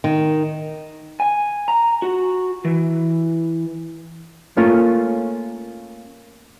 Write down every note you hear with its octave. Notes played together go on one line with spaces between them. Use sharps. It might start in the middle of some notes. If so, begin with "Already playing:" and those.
D#3
G#5
A#5
F#4
E3
A3 A#3 C#4 F4